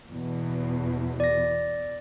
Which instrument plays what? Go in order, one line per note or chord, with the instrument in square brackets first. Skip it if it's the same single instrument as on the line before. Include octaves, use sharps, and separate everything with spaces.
[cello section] E2 B2
[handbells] D5 A#6